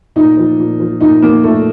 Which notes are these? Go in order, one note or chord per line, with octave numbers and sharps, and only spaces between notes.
A#2 D#4
F3
A#2
F3
A#2 D#4
F3 A#3
A#2 A3